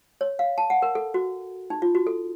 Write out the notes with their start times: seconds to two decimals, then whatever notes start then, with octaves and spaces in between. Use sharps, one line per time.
0.21 C#5
0.39 F5
0.58 A5
0.70 F#5
0.82 A#4
0.95 A4
1.14 F#4
1.70 D#4
1.82 F4
1.95 F#4
2.07 A4